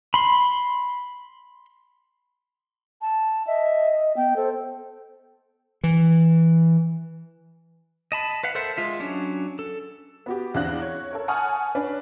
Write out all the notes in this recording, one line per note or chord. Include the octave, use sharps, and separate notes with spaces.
B5 C6
A5
D#5 E5
B3 G5
A4 C5
E3
D#5 A5 B5
B4 F5 F#5
A4 A#4 C5 E5 F#5
G#3 F4 E5
F#3 C#4 D4
A4
B3 F#4 G4
E2 C4 D4 F5 F#6 A#6
C#5
A4 A#4 C#5
F#5 G#5 A5 C#6 D#6 F6
C#4 D4 B4